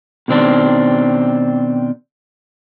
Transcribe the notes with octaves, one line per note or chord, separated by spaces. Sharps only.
B2 D#3 C4 D4